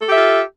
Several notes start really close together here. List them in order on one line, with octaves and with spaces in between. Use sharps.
A4 G4 E5 F4